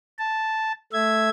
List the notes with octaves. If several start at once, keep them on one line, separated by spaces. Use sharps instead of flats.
A5
A3 E5 G#6